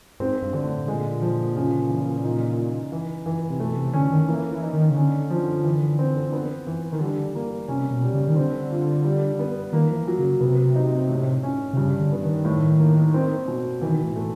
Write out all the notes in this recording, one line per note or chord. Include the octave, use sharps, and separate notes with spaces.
G#2 C4
G2
D3
A2
A#2 G#3
F3
C#3
E3
D#4
D#4
E3
E3
C3
B2 A3
C3
D3 C#4
D#3
E3 A#3
E3
D#4
D#3
C#3
D3 C#4
F3
E3
C4
B3
E3
D#3
D3 G3
A#3
C3 C#4
B2
G3
C#3
D#3
D3 C4
F4
G3
B3
D#3 A#3
F3
E3
F#3
C#3
C3 B3
D#4
A2
C#4
C3
G2 C#3
D3
B3
D#3
A2
A#3
C4
B2
D#3 E3
A2
A3